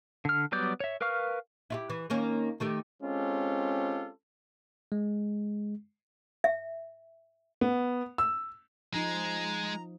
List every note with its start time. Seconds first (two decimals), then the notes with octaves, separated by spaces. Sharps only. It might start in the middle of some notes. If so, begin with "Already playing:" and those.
0.25 D3 F6
0.52 F#3 G3 B3 D5 G6
0.80 C#5 E5
1.01 A#4 B4 F5 C#6 F6
1.70 E4 F4 G4
1.90 E3
2.10 D#3 A#3 C#4
2.60 D#3 A3 G4
3.01 G#3 C4 C#4 F4 G4 A4
4.92 G#3
6.44 E5
7.61 B3
8.18 E6
8.94 F3 G#3 D#4 A#5